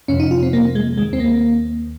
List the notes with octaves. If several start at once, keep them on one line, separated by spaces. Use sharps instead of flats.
F2 C3 F3 C#4
D#4
F4
C4
A#3
G#3
D#2 D#3 G#3
C4
A#3